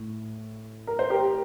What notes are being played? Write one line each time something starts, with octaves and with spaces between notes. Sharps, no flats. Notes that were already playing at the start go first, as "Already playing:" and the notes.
Already playing: A2
A#4
C5
G4 A#4